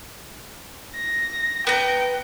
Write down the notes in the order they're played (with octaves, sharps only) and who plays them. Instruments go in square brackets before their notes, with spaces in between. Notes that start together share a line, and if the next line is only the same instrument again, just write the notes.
[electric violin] A#6
[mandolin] B3 A#5 [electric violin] G5